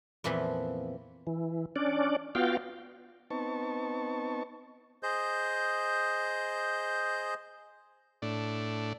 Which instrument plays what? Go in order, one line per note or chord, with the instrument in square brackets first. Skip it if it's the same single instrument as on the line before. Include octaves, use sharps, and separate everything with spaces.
[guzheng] F2 A#2 E3 F3 B3 E4
[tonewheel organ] E3
C#4 D4 D5
B3 F4 F#4 F5 G5
[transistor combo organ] B3 C4 D#4 A5 C#6
[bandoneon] G#4 C5 D#5 G6
[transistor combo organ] A2 D4